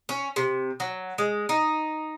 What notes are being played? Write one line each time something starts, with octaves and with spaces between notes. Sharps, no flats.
C#4
C3
F#3
G#3
D#4